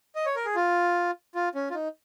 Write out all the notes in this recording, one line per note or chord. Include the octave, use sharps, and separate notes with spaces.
D#5
C#5
A#4
G#4
F4
F4
C#4
F4
D#4